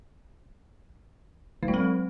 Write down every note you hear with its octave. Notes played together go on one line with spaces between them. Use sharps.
F#3
G#3
C4